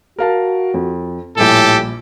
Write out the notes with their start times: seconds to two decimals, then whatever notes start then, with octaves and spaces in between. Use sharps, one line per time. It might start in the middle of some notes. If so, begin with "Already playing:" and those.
0.18 F#4 A#4 F5 A5
0.74 F2
1.37 A#1 A2 G3 G4 A4 G#5